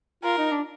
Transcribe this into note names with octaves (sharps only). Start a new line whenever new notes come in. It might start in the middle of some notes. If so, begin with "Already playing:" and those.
F4 A#4
D#4
D4